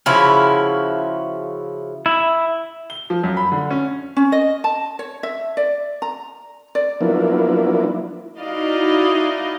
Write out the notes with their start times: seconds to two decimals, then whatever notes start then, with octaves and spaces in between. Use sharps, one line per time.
0.06 C#3 F3 E4 F#4
2.06 E4
2.90 G7
3.10 F3
3.23 F#2
3.37 B5
3.52 D3
3.71 C#4
4.17 C#4
4.32 D#5
4.64 A5
4.99 C#5
5.23 E5
5.57 D5
6.02 A#5
6.75 D5
7.01 F3 F#3 A#3 B3 D4 E4
8.37 D#4 E4 F#4 D5 D#5 F5